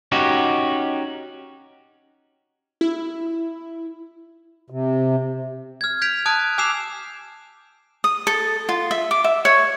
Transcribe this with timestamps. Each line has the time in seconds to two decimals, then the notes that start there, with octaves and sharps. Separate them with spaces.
0.12 C#4 D#4 F#4 G4
2.81 E4
4.70 C3
5.81 F6 G#6
6.01 G6 G#6 B6 D7 F7
6.26 A5 D#6 F#6 G#6 D7
6.58 G#5 D6 E6 C7 E7 F7
8.04 D#6
8.27 A4
8.69 F4
8.91 E5
9.11 D6
9.24 E5
9.45 C#5